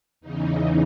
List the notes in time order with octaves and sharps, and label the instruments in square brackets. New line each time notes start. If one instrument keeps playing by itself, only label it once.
[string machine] E2 C#3 E3 D#4